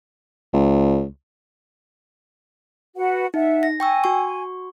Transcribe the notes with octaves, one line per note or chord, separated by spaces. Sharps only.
C#2
F#4 B4 F#5
D#4 E5 F#5
A#6
G5 G#5 C#6 E6
F#4 C#6